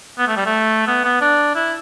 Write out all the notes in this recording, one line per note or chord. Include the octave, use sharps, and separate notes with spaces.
B3
A3
G3
A3
B3
B3
D4
E4